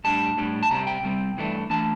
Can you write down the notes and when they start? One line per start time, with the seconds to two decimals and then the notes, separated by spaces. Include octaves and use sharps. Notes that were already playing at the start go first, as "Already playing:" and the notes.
0.04 A2 G3 D4 A5
0.37 A2 G3 D4
0.63 A5
0.71 C3 G3 C4 A#5
0.87 G5
1.03 C3 G3 C4
1.37 G2 E3 A3 D4
1.70 E3 A3 D4 A5